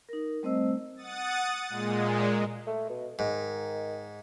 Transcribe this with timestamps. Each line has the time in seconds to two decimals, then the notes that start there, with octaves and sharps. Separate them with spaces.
0.09 D#4 A#4
0.43 G3 A3 C4 C5 D#5 E6
0.96 F#5 D#6 A6
1.69 A#2 G#3
2.67 A3
2.89 B2
3.19 G#2 D#3